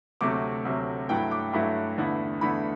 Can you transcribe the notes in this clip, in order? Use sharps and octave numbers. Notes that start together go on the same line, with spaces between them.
D2 C3 F#3 A3 D6
D2 C3 F#3 A3
G2 F#3 A3 E4 G5
D6
G2 F#3 A3 E4 B5
E2 D3 A3 E4
E2 D3 A3 E4 B5